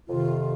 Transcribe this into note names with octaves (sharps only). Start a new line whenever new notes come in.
F2 C3 D#3 F4